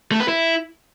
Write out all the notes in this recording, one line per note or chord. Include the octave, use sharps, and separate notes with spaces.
A3
B4
E4